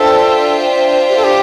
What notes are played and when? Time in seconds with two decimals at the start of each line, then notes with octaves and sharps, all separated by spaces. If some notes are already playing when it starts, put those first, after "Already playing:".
Already playing: D4 F4 A4 C5 E5 G5
1.09 G4
1.16 A4
1.24 G4